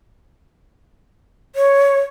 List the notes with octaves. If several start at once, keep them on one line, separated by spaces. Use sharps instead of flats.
C#5